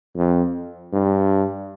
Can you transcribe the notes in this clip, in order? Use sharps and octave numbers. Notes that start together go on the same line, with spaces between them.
F2
G2